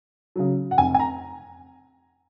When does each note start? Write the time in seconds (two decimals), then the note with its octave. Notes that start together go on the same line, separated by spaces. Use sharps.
0.36 C#3 F#3
0.71 F#5
0.78 F1 G#5
0.94 G#5
0.99 A#5